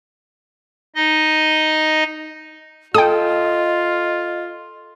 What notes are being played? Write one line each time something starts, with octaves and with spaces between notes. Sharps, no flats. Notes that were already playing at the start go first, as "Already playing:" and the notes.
D#4 D#5
F4 A4 D#5 G5 D#6